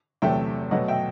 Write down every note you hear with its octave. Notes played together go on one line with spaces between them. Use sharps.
E2 C3 F#3 A3 E5 G5
B2 F#3 A3 D#5 F#5
E5 G5